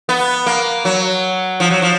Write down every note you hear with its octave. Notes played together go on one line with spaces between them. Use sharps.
B3
A#3
F#3
F3
F#3
F3